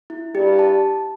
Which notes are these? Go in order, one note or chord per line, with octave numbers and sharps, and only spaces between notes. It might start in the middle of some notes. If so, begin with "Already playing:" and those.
E4
G2 G3 G4
A5